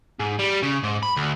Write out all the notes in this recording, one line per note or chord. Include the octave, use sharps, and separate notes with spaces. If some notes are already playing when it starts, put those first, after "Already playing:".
G#2
G3
C#3
G#2
B5
D2